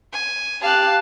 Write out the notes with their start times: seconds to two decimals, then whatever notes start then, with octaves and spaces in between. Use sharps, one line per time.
0.13 G#5
0.62 G4 F5 A5 F#6